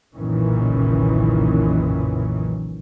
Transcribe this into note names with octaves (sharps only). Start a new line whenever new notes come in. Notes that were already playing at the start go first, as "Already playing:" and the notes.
F#1 B1 A#2 D#3 E3 C#4